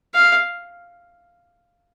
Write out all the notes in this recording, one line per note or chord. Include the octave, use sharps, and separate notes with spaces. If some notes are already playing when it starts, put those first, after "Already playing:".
F5